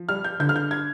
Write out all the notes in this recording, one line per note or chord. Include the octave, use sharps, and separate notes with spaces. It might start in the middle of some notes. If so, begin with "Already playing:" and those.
Already playing: F3
G3 F6
G6
D3 G6
F6
G6
G#6